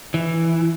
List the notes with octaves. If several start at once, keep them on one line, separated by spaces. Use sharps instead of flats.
E3